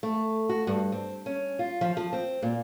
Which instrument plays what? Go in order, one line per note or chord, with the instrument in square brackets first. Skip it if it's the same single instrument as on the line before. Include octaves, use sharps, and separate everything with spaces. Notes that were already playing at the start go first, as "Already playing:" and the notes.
[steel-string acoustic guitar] A3
F#4
G2
C4
C#4
F4
F3
F3
C4
A#2